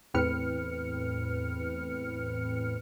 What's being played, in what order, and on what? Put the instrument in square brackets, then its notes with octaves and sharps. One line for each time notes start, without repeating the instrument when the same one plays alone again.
[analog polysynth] E2 A2 C4 B4 F6 C#7